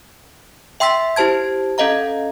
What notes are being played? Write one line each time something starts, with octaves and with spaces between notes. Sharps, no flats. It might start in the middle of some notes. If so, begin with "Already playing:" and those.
E5 G5 C6 E6 B6
E4 G4 C5 A5 G#6
C#4 A4 D#5 F5 A#5